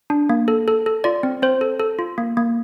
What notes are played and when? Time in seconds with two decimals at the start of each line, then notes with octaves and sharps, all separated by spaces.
0.10 D4
0.30 A#3
0.48 A4
0.68 A4
0.86 A4
1.04 F4 D5
1.23 C4
1.42 C4 C5
1.61 A4
1.80 A4
1.99 F4
2.18 A#3
2.37 A#3